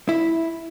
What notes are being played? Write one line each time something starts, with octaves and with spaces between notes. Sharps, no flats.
E4